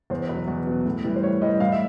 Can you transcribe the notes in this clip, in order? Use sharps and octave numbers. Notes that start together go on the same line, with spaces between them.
E2 C5
B2 F#3 B4
E2
B2 F#3
A2
E3 G3
C5
A2 C#5
E3 G3 D#5
A2 F5
E5